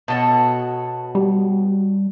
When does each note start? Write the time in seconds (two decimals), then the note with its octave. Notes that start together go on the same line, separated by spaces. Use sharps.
0.08 B2 F#4 A4 C#5 D#5 A5
1.15 G3